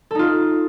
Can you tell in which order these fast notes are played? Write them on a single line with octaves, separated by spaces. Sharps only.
A4 D#4 F4